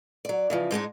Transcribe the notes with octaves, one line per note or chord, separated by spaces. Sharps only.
F#3 D5
C#3 E3 F3
G#2 G#3 D4 D#4